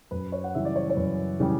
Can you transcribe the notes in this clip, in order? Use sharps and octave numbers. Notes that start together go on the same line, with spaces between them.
F#2 B4
C#5
F#5
C#3 E3 G3 E5
D5
C#5
C#5
F#2 B4
C#3 E3 G3